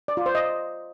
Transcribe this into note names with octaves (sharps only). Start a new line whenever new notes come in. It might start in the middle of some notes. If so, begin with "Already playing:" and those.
D5
F4
C5
D#5